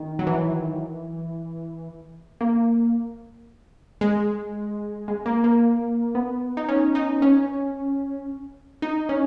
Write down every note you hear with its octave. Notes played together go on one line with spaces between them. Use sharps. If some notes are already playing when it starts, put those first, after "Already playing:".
Already playing: D#3
F#3
E3
A#3
G#3
G#3
A#3
A#3
B3
D#4
C#4
D#4
C#4
D#4
C#4